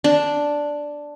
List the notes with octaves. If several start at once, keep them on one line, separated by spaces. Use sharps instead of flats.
D4